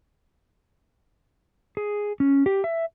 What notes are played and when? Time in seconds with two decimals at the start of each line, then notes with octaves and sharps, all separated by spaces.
1.77 G#4
2.20 C#4
2.46 G4
2.64 E5